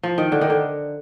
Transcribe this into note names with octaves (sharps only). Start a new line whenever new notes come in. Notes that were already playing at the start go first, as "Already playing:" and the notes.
F3
D#3
D3
D#3
D3